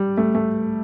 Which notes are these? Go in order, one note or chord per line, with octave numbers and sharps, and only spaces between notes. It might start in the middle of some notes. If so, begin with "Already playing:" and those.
Already playing: G3
A3
A3